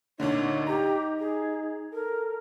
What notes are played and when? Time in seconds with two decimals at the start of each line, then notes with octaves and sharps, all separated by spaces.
0.20 D2 A#2 D3 D#4 C#5
0.67 G4 A#5
1.19 G#4
1.93 A4 A#4